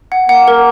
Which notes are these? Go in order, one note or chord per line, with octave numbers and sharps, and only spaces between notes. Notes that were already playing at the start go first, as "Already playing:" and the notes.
F#5
A#3 F#5
A#4